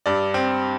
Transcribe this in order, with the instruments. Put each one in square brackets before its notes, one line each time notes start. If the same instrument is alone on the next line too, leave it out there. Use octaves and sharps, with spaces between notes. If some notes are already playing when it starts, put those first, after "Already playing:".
[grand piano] G2 D5
C4